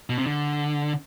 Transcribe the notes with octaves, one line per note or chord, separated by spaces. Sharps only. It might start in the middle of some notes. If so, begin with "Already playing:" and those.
B2
C3
D3